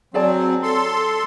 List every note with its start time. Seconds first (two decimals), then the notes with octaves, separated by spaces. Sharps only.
0.14 F#3 C4 G#4 D5 A5
0.63 A4 C6